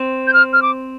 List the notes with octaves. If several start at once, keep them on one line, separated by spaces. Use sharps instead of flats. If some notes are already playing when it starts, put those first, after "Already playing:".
Already playing: C4
G6
F6
F6
D6